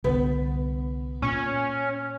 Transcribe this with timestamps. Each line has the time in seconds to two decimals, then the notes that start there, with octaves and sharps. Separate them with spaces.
0.04 C2 D3 B3
1.22 A#2 C#4